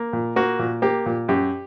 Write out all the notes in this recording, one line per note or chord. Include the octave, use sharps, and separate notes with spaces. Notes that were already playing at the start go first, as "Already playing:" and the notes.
Already playing: A#3
A#2
A#3 F#4
A#2
A#3 G4
A#2
F#2 G4